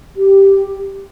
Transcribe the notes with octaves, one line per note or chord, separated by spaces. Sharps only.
G4